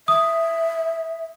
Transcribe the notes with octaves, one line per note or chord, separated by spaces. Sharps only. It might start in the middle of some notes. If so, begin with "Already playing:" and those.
E5 D#6